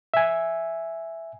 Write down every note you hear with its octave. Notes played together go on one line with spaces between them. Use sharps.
E5 G#5